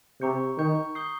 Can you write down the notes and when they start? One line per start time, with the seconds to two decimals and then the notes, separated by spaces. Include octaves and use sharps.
0.21 C3 A#5 C#6 G6 C#7
0.58 D#3 A#5 C#6 G6 C#7
0.95 D#6 G6 C7 G7